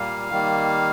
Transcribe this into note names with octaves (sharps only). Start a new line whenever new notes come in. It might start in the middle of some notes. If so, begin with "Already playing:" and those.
Already playing: A#2 G3 A#3 F5
D#3 G3 A#3